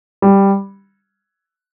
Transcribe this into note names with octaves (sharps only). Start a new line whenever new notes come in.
G3